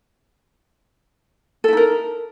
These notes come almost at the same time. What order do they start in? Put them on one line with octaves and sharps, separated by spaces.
A4 E4 D#4 A#4